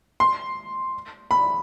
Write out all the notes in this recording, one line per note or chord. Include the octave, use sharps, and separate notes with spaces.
C6
B5